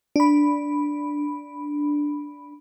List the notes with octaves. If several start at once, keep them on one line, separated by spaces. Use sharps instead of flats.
D4 B5